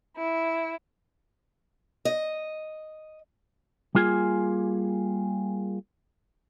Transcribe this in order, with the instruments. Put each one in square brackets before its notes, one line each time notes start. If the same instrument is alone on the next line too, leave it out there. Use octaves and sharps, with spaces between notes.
[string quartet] E4
[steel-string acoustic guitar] D#5
[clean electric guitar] G3 A#3 F4 G#4 G#5